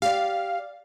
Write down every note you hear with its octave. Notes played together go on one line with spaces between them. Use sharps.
G4 D5 F5